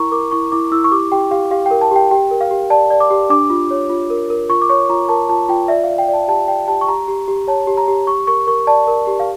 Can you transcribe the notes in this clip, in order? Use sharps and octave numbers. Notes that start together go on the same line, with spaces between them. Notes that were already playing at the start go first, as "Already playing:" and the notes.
Already playing: E4 A#4 A#5 C#6
A#4 D6
E4 C#6
E4 D6
E4 E6
C#6
G4 D6
G4 G5
G4 F5
G4 F5
A#4 G5
A5
G4 G5
G4 G5
A#4
F5
G4
D5 A5
D5
D6
G4
D4 D6
F4
C#5
F4
A#4
A#4
F4 C#6
D6
C#5 C#6
F4 A#5
A#4 A5
F4 A5
F4 G5
D5 E5
F5
D5
G5
D5
A5
G4 A5
D5 G5
G4 A5
C#6
G4 A#5
G4
G4
C#5 A5
G4
A#5
G4
G4 C#6
A#4 C#6
A#4 C#6
D5 A5
A#4
G4
F5